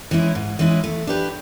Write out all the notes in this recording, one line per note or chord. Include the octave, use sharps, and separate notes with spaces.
E3 G#3 C#4 E4
G#2
E3 G#3 C#4 E4
A3
D4 G4 B4